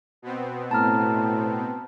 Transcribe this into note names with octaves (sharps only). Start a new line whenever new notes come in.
B2 B3 C4
A2 A5 A#5 F6